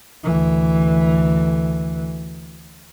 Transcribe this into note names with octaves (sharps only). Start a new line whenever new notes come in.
D2 E3